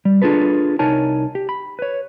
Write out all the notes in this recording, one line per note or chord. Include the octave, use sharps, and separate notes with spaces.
G3
D4 F4 G#4 A4 B4
C2 D#4 A#4 C#5 G#5 A5
G4
B5
B4 C#5